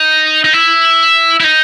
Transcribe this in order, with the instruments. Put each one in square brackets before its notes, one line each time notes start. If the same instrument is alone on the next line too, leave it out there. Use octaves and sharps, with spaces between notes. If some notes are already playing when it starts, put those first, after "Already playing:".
Already playing: [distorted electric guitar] D#4
D#4
E4
E4
D#4